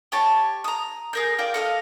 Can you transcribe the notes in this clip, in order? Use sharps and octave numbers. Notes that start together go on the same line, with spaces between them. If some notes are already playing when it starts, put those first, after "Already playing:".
G4 C#5 A5
A#5 D#6
G#4 A#4 G6
F4 A#4 D5 G5
A4 D#5 F5